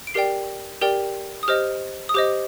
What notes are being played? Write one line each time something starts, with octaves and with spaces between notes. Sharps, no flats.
D7
G4 A#4 D5 G5 C7
G4 A#4 D5 G5
D#6
G4 C5 D#5 F6
D#6
G4 C5 D#5 D6